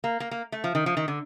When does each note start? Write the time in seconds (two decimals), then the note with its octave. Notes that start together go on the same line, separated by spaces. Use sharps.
0.04 A#3
0.20 A#3
0.31 A#3
0.52 A3
0.64 F3
0.75 D#3
0.86 F3
0.97 D#3
1.08 D3